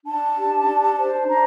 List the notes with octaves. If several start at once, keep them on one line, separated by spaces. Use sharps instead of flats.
D4 A5
G4
D4
C5
D4 A#5